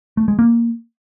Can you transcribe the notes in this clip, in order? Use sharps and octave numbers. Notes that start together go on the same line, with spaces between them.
A3
G#3
A#3